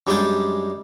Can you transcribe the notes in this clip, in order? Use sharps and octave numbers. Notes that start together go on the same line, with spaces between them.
F#2 G3 G#3 D4 D5 G5